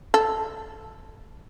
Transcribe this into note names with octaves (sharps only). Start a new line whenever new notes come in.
A4